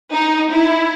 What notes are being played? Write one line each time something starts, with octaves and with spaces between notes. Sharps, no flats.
D#4
E4